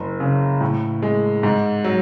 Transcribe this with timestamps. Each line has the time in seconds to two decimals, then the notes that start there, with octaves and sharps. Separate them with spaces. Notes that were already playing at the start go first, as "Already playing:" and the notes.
Already playing: F#1
0.20 C#3
0.61 A2
1.03 G#3
1.43 G#2
1.84 F#3